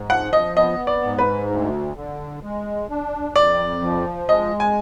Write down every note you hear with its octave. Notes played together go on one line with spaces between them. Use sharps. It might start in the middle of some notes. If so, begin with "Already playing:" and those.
Already playing: G#2
F3 F#5
D#5
B3 D#5
D5
G#2
B4
D2
D3
G#3
D4
F2 D5
F3
G#3 D#5
G#5